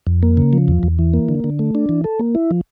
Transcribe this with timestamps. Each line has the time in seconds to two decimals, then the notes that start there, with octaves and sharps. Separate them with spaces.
0.07 F2
0.23 A#3
0.37 C#3
0.53 F3
0.68 E2
0.83 E2
0.99 E3
1.13 A#3
1.29 D3
1.44 D3
1.59 A3
1.75 D4
1.89 E3
2.04 A4
2.19 A#3
2.35 E4
2.51 F3